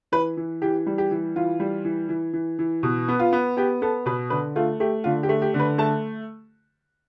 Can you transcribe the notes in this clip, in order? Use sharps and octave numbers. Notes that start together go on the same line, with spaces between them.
E3 B4
E3
E3 G4
G3
G4
E3
E3 F4
G3
E3
E3
E3
E3
B2
B3
F4
B3
B3 G4
B3 A4
B2 B4
D3 B4
A3 F4
A3 G4
D3 F4
G4
A3
G4
D3
B4
A3 A5